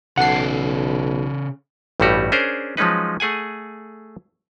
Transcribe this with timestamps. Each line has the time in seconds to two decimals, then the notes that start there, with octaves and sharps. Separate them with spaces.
0.17 B1 C#3 A4 F#5 C7
2.00 A1 G2 G3 A3 F#4 G4
2.32 C#4 D4 G#4 A#4 C5
2.77 F3 F#3 G#3 C#4 D#4 B4
3.20 A3 G#4 F#5 G#5